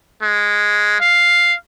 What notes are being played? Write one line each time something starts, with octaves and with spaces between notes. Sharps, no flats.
G#3
F5